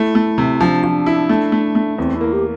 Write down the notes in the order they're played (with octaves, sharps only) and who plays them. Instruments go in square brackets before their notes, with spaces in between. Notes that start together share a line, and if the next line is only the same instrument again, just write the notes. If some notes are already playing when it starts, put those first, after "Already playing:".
Already playing: [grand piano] A3 [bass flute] E4
[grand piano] A3
C3
[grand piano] F3 [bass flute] D4
[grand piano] F3
E4
A3
A3
A3
[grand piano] E2 [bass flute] C4
[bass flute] E4
[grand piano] A#3
[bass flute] G4